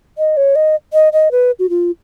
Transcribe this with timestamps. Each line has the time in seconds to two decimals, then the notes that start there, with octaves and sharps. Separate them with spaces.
0.18 D#5
0.37 C#5
0.56 D#5
0.93 D#5
1.13 D#5
1.31 B4
1.59 F#4
1.70 F4